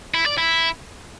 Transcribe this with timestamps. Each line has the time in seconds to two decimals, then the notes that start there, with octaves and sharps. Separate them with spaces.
0.14 E4
0.26 D5
0.38 E4